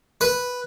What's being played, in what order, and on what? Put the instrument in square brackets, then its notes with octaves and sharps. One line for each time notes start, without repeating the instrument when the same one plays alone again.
[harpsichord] B4